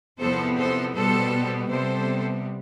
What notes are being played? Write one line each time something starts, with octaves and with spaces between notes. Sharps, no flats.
E2 C3 F3 B3 A4 C5
A4 C5
B2 G3 B3 A4 C5
C3 G3 B3 A4 C5